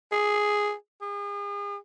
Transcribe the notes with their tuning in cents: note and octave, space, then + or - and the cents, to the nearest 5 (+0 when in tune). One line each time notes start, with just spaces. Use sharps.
G#4 +0
G#4 -40